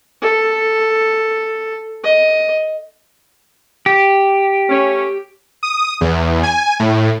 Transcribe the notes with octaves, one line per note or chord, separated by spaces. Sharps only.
A4
D#5
G4
A3 C#4
D#6
E2
G#5
A2